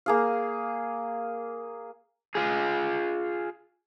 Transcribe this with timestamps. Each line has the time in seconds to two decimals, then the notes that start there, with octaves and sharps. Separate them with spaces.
0.06 A#3 G#4 F5
2.35 F4 G#4